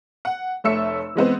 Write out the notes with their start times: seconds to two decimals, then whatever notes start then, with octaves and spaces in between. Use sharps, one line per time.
0.25 F#5
0.64 F1 A3 C#5 E5 E6 C#7
1.15 E3 G#3 B3 C4